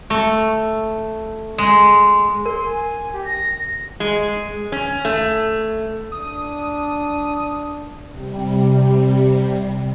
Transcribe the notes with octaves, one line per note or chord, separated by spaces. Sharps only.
A3
G#3
A#4 C6
G#5
G4
A#6
G#3
C#4
A3
D4 D#6
C3 G3